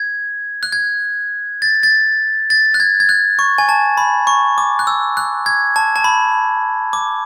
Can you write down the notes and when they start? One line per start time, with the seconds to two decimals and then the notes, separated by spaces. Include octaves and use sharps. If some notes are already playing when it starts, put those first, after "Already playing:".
Already playing: G#6
0.63 F#6
0.72 G#6
1.62 A6
1.83 A6
2.50 A6
2.74 F#6
2.80 G#6
3.00 G#6
3.09 F#6
3.39 C#6
3.58 G#5
3.69 A5
3.97 B5
4.27 C#6
4.58 D6
4.79 F#6
4.87 E6
5.17 F#6
5.46 G#6
5.76 A5
5.96 A5
6.04 B5
6.93 D6